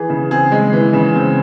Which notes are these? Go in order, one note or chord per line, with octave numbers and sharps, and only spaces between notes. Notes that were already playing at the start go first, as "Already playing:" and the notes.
Already playing: E3 G#4
C#3
C4 G#4
G#3
E3
C#3
C4